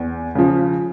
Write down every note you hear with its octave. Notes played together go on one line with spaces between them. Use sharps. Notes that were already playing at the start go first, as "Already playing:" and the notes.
Already playing: E2
C#3 F3